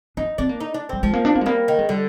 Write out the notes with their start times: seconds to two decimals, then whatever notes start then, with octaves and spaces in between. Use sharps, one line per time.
0.17 D4 D#4
0.38 C4 D4
0.49 A#3
0.60 D#4
0.74 D4
0.89 G3 C4
1.03 F3 G#3
1.14 A#3
1.25 D4
1.35 A#3
1.41 G#3
1.46 G3 A#3
1.68 D#3
1.79 G#3
1.89 D3 G3